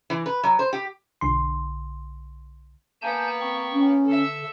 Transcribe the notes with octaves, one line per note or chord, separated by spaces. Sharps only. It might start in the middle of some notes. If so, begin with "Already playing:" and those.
E3
B4
F#3
C5
G4
B1 D3 C6
A#3 B3 G#5 A5 G6
C4 C#6
C#4
D3 A4 E5